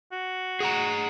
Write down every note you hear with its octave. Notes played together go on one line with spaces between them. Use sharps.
F#4
G#4 F#5 A#5